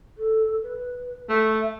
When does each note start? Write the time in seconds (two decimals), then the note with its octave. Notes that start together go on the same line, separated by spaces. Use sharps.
0.18 A4
0.63 B4
1.29 A3 E5